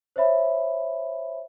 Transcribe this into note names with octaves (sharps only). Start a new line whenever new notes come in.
C5 C#5 E5 B5